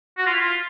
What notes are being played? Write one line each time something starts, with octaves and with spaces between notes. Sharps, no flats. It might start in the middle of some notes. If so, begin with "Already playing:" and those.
F#4
F4
E4
F4